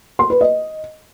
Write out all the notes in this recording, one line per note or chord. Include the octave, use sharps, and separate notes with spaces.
C6
B4
D#5